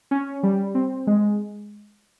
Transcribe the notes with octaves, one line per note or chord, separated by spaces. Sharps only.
C#4
G3
C4
G#3